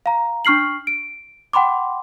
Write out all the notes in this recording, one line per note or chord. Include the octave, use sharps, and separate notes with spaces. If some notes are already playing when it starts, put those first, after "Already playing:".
F5 A#5
D4 C#6 F6 C7 F#7
D7
F#5 G5 B5 C6 D6